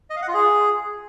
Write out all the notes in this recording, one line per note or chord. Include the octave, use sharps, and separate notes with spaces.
D#5
F5
F#5
F4
G#4